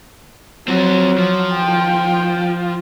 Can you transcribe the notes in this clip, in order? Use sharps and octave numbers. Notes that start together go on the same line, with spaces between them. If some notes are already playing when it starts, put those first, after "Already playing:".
F3 F#3 C4
F3
G5